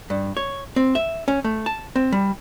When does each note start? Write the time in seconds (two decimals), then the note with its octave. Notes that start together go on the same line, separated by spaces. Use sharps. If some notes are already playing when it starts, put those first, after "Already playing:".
0.10 G2
0.37 C#5
0.76 C4
0.95 E5
1.28 C#4
1.44 A3
1.66 A5
1.96 C4
2.12 G3